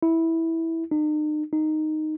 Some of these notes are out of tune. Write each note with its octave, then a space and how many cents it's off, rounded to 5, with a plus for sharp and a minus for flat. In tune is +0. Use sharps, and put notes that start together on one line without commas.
E4 -10
D#4 -40
D#4 -5